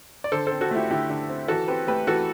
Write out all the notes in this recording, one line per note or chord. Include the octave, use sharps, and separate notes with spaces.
D5
D3 A4 C5
C4 A4 C5
F#4 A4
A3 E4 G4
D3 E4 G4
D3
C4
E3 F#4 A4
C4 G4 B4
A3 G4 B4
E3 F#4 A4